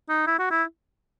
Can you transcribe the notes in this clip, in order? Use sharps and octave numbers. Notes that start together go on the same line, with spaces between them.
D#4
E4
F#4
E4